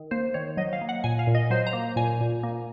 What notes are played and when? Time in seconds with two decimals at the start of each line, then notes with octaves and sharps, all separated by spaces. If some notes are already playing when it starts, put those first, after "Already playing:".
Already playing: D#3
0.11 A#3 C5
0.34 D#3 C#5
0.57 F#3 D#5
0.73 F5
0.81 A#3
0.89 F#5
1.04 A#2 G#5
1.19 F5
1.27 A#2
1.35 D#5
1.50 F#3 C5
1.67 A#5
1.73 A#3
1.96 A#2 G#5
2.21 A#2
2.43 A#3